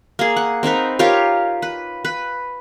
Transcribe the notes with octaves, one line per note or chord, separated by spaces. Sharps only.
A#3 G#4
F#5
C4 D#4 A#4 B4
F4 G4 A#4 C#5
B4
B4